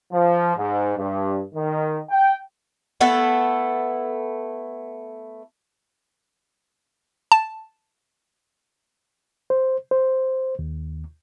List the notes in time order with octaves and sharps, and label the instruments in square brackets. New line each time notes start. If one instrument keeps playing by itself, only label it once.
[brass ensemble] F3
G#2
G2
D#3
G5
[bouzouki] A3 B3 E4 A4
[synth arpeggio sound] A5
[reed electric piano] C5
C5
D#2